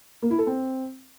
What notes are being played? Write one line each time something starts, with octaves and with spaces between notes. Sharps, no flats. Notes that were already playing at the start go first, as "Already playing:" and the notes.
A#3
E4
A4
C4